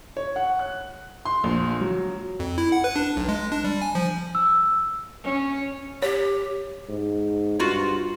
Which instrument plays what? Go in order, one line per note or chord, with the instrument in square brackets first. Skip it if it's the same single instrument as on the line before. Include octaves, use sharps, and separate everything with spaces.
[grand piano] C#5
F#5
F#6
C6
A#1
F#3
[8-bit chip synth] F2
E4
F#5
B4
D4
B1
G#3
D4
G3
G#5
F3
[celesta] E6
[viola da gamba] C#4
[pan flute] G4 [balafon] C#5
[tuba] G#2
[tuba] G2 [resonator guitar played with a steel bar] F4 F#4